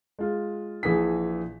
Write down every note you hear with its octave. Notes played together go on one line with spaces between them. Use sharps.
G#3 F4
A#1 E3 G#4 B6